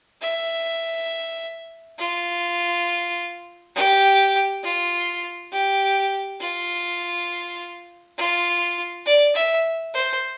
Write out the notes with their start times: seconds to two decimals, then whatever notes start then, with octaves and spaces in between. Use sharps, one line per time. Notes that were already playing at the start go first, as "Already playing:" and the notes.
0.22 E5
1.98 F4
3.75 G4
4.64 F4
5.52 G4
6.40 F4
8.18 F4
9.06 D5
9.35 E5
9.94 C5